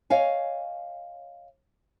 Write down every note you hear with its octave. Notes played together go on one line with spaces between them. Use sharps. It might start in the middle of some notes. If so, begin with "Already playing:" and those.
C#5 D#5 F5 G#5